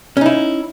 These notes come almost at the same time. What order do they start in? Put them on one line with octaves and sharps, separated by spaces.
C#4 D#4 E4